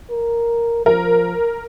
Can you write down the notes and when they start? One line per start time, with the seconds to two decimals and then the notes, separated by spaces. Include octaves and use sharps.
0.10 A#4
0.86 F3 A#4